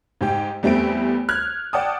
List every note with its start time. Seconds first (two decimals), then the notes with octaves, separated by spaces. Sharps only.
0.21 G#2 G4 G5
0.63 E2 G3 A3 C4 D7
1.29 F6 F#6 G#6
1.73 D5 F#5 G5 A5 D#6